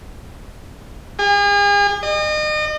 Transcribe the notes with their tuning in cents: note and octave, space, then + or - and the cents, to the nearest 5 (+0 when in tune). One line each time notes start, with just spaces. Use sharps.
G#4 -40
D#5 -35